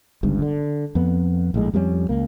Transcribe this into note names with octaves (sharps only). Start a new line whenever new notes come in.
G1 C#2 G2
D3
F2 B3
A#1 A2 G#3
F2 G3 G#3 C#4
C#2 A#3